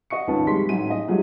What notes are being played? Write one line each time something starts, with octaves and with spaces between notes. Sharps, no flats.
D#5 F#5 C#6 C#7
D#2 F3 C#4 B4 A5
C3 G3 G#3 C6 B6
A1 F#3 D#4 E4 G#5 D#7
D#5
F3 F#3 G#3 A3 D#4 G4